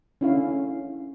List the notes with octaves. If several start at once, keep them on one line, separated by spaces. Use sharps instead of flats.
C#4 D4 E4 A4 F5